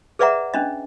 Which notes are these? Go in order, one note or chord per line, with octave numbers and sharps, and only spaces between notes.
G#4 B4 D5 E5 F#5 A#5
C#4 D4 D#5